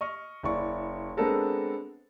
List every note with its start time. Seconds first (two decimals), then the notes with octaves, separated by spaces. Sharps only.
0.01 D#5 C#6 F6
0.43 F#1 E4 D5 C#6
1.17 G#3 B3 C4 D4 A4 A#4